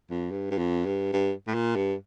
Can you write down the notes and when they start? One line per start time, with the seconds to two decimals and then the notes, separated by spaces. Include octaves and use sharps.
0.10 F2
0.31 G2
0.51 G2
0.58 F2
0.86 G2
1.13 G2
1.47 A2
1.55 A#2
1.75 G2